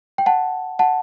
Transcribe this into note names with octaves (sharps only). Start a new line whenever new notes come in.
G5
F#5 A5
F#5 A5